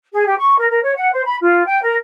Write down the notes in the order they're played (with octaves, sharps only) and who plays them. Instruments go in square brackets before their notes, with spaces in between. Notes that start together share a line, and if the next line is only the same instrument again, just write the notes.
[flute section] G#4
G4
C#6
A#4
A#4
C#5
F#5
C5
B5
F4
G5
A#4